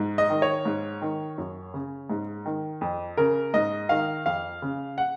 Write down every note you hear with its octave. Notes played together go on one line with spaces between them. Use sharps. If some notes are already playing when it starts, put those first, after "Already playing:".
Already playing: G#2
D#5
D#3
C#5
G#2
D#3
F#2
C#3
G#2
D#3
F2
C#3 A#4
G#2 D#5
D#3 F5
F2 F5
C#3
F#5